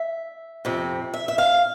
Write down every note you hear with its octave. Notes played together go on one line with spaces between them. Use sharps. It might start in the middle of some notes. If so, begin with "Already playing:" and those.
Already playing: E5
F2 C3
E5
E5
F5